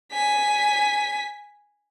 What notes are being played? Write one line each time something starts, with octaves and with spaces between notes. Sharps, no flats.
G#5 B6